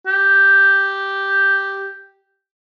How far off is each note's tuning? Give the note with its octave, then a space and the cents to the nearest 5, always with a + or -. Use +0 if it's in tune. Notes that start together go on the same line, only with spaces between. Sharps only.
G4 +0